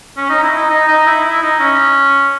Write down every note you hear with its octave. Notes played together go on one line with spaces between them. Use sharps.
C#4
D#4
E4
D#4
D#4
D#4
E4
E4
D#4
C#4